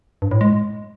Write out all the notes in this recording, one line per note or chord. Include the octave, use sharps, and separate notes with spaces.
G2
A2
G#3